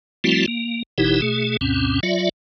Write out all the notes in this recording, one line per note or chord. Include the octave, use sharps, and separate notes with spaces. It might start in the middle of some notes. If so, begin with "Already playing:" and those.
F3 G3 A3 C4 E4 F#4
A#3
F#1 B2 E3 D#4 E4 G4
B2 A3 G#4
D2 G2 B2 C4 C#4
F#3 F4 D5 E5